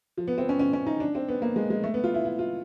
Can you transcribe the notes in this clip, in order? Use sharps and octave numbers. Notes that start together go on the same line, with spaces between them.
F3
B3
C4
C#4
C#4
C#4
D#4
D4
C4
B3
A#3
G#3
G#3
A3
B3
F4
E4
E4
F4